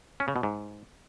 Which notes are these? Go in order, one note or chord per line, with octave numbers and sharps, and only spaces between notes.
C#4
C#3
B2
G#2